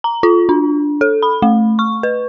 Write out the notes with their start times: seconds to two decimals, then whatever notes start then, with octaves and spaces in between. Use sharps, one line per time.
0.04 A#5
0.23 F4
0.49 D4
1.01 A4
1.23 B5
1.42 A3
1.79 C#6
2.03 B4